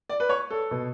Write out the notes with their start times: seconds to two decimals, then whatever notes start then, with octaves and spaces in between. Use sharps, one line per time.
0.09 D5
0.20 B4
0.29 C#5
0.50 A4
0.71 B2